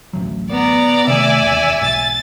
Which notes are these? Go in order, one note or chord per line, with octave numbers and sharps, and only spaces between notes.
A1 D2 F#3
B3 D5 A#5
C3 D#3 A3 E5 G#5
E1 D#2
B1 G#2 A6